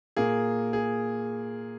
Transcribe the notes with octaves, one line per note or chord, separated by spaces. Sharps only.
A#2 A#3 G#4
G#4